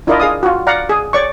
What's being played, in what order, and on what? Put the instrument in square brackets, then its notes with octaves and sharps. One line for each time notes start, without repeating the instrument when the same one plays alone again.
[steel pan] D4 E4 F4 A#4 D5 D#5
G#4 F5 D#6
F4 F#4
D5 F5 F#5 A#5
G#4
C#5 D5 C#6